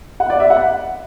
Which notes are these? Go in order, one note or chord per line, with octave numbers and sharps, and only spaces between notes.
F#5
D5
E5
F#5